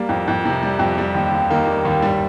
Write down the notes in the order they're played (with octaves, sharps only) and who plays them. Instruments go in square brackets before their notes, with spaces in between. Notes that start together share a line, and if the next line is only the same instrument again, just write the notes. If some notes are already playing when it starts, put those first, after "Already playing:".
Already playing: [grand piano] G3 A#3
F2
F2
C3
G3
F2
G3
D#2
D#2
D#3 A#3
G3
D#2
G2 G3